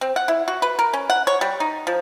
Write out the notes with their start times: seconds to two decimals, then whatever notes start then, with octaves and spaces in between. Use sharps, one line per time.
0.01 C4
0.16 F#5
0.28 E4
0.48 F#4
0.62 B4
0.79 A#4
0.93 C#4
1.10 F#5
1.27 C#5
1.41 G3
1.60 D#4
1.87 F3